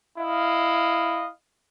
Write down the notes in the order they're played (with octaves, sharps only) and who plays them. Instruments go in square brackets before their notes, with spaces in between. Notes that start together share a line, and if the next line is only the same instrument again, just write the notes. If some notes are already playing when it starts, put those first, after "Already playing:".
[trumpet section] E4 D#5 F5